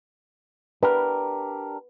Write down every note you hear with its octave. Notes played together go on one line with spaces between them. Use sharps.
D4 G4 A#4 B4